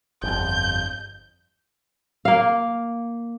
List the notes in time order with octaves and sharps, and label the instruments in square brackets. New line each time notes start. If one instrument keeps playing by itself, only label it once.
[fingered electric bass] G1 F2 [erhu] G6
[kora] A#3 F5